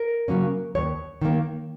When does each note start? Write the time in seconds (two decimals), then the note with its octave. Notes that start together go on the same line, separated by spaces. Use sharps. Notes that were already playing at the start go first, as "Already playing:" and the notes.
Already playing: A#4
0.28 C#3 F#3 A#3 C#4
0.75 D#2 C#5
1.21 D#3 A#3